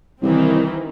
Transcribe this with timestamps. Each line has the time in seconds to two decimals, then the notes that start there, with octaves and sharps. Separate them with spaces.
0.22 C2 D#3 E3 C4